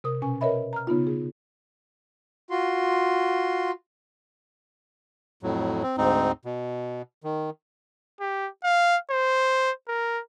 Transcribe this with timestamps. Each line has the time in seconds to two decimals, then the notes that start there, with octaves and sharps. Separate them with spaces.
0.04 C3 A#4 D#6
0.22 B2 C#4 G#5
0.41 A#4 B4 C#5 D#5 E5 B5
0.73 A#5 F6
0.87 C#3 B3 D#4 F4
1.07 G#4
2.50 F4 F#4 C6
5.43 F2 A2 F#3
5.83 C4
5.98 D2 G#2 C4 D#4
6.45 B2
7.24 D#3
8.20 G4
8.64 F5
9.10 C5
9.88 A#4